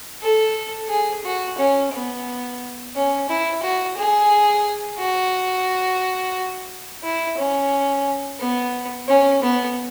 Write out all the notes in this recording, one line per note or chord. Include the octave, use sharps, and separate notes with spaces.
A4
G#4
F#4
C#4
B3
C#4
E4
F#4
G#4
F#4
E4
C#4
B3
C#4
B3